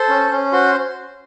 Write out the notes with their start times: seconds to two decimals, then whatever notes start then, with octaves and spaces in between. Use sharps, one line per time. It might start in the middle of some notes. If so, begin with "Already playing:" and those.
Already playing: A4 C5 C6
0.09 C#4
0.31 C#4
0.53 F#4 C5 C6